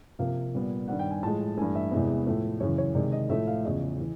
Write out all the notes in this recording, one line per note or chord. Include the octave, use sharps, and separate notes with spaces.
C3 F3 A#3 F5
A#2 G3 B3
G2 D#3 G3 F#5
G5
G#5
A2 F3 G#3 A5
G2 E3 A3 G#5
E5
E2 C3 E3 G#3 B3
A2 F3 A3
F#2 C#3 E3 C#5
C#5
C3 D#3 G#3 D5
D#5
A2 F3 A3 E5
F5
E2 C#3 F3 D#5
E3